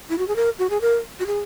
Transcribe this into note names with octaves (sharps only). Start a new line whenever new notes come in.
E4
F#4
G#4
A#4
F#4
G#4
A#4
F#4
G#4